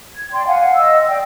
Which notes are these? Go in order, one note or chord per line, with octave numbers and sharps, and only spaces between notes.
G#6
D5 G5 C6
F5 F#5 G#5
D#5 E6
D5 G5